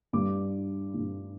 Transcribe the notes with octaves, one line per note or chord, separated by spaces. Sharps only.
G2 G3 D6
G2 G3